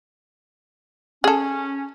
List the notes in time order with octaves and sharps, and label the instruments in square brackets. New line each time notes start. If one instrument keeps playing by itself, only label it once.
[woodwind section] C#4 [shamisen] G#4 A4